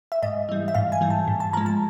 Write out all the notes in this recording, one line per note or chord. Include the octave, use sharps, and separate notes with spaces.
E5
G#2 D#5
E3 G3
E5
G#2 F5
G#5
E3 G3
A5
G#2
A5
F3 G#3 A#5
A5